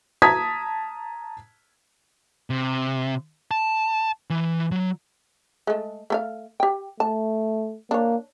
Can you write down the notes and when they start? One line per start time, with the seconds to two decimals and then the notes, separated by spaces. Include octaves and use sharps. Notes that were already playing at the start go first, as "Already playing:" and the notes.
0.22 A5 A#5 D#6 G#6 B6
2.50 C3
3.51 A5
4.30 E3
4.72 F#3
5.67 G#3 A3
6.10 A3 A4 F5
6.60 G4 G5
7.00 A3 A5
7.91 A#3 D4 C#5